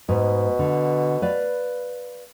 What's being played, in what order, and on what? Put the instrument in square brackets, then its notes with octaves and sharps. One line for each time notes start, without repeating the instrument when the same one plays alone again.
[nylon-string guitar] G#2 [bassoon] B2
[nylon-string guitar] D3
B4 D5 F5